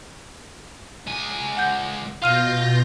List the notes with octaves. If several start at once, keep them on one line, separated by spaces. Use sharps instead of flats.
C#2 G#5
F#5 G6
B2 F4 F5 F6 G6 A#6 D#7